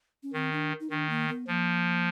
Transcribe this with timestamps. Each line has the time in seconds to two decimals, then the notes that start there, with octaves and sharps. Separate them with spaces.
0.23 C#4
0.33 D#3 C4
0.52 D4
0.80 D#4
0.90 D#3 D4
1.09 A#3
1.28 B3
1.47 F3 A#3